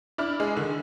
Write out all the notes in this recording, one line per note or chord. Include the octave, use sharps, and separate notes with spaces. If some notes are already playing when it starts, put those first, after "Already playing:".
D4 E4 F6
G#3
D3 D#3